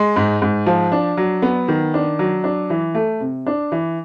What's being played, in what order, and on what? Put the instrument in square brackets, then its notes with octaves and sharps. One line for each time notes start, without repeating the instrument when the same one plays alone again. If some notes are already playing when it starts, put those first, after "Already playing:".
Already playing: [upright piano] G#3
G#2
G#2
F3
D4
F#3
B3
D#3
D4
F#3
D4
E3
A3
C3
D4
E3